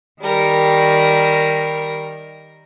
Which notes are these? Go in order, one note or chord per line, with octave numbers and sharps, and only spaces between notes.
D#3 G3 A#4